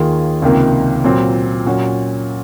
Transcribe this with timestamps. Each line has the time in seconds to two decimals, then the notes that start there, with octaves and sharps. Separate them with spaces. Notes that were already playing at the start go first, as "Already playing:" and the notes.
Already playing: D#2 D#3 A#3 F4 G#4
0.42 C#2 C3 D#3 A#3
1.04 A#2 F#3 C4
1.66 A#2 F#3 C#4 F#4